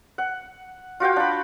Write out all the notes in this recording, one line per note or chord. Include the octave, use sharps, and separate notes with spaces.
F#5
F4 F#4 F5 G5
D4 B5